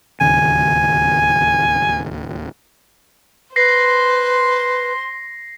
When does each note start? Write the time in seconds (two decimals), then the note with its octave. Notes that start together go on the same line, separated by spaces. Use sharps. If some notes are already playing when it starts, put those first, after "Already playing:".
0.21 D1 D#2 C#3 G#5
3.56 B4 C5 C6 A#6 C7